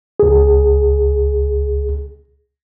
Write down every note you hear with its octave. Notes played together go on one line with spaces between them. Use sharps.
C#2 G#4